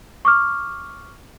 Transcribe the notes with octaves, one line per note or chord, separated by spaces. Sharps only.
C#6 D6 F6